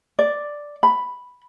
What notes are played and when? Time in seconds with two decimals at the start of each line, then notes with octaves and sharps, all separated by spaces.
0.19 D5
0.83 B5